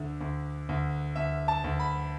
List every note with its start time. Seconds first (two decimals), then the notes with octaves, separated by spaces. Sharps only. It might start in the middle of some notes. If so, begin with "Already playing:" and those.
Already playing: D2 D3
0.21 D2
0.69 D2
1.16 D2 E5
1.48 A5
1.64 D2
1.80 B5